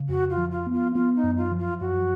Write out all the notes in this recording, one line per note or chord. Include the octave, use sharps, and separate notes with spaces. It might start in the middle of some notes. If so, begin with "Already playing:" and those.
Already playing: C#3
F2 F#4
F4
F3
F4
B3
F4
B3 F4
D#4
F#2
F4
F3
F4
F#2 F#4